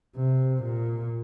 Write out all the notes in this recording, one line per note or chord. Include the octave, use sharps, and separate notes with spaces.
C3
A#2